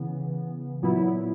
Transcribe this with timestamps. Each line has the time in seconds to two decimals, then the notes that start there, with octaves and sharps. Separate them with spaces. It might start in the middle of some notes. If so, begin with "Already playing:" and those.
Already playing: C#3 E3 B3
0.82 A#2 F#3 B3 E4